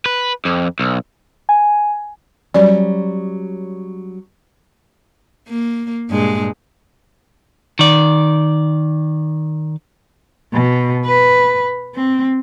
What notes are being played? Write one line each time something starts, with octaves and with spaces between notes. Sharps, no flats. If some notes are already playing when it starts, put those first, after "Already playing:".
B4
F2
B1
G#5
F#3 G3 C#4 D5
A#3
G2 A#2 G#3
D#3 D5
B2
B4
C4